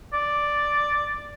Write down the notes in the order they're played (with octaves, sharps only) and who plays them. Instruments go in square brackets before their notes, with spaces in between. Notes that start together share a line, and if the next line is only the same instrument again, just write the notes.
[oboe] D5